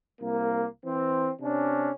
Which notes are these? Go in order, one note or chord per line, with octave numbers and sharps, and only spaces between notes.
C2 A#3
E3 C4
C3 C#4 D4